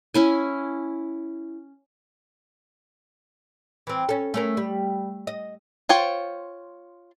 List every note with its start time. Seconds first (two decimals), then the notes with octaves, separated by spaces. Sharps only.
0.14 C#4 E4 G#5
3.87 E3 C4
4.09 C#4 A4
4.34 A3 C#4 A#4
4.57 G3
5.27 D#5
5.89 F4 C5 C#5 G5